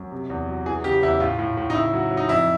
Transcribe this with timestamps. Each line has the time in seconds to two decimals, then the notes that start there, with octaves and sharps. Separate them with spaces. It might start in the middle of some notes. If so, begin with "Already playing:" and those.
Already playing: F#2
0.12 C3
0.30 E2
0.48 F#3
0.66 E3 G#4
0.84 C#3 G4
1.03 E2 E4
1.20 A2 F4
1.39 A2
1.57 A2
1.70 D#4
1.74 C#3 E4
1.93 F#3
2.11 F#3
2.17 D#4
2.29 F2 E4